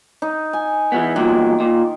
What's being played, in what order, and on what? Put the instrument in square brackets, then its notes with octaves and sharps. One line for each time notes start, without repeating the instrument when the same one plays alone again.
[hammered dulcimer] D#4
G#5
[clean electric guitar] E3 F#3 B3
[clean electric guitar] E2 A#2 F#3 [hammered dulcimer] D#3
[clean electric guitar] A#2